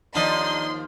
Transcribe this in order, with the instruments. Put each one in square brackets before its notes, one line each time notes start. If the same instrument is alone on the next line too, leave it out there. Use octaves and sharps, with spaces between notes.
[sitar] D#2 F3 [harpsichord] D4 D#5 [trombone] D#4 [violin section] C6